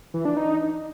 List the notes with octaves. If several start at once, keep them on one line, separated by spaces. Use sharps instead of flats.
E3
D4
D#4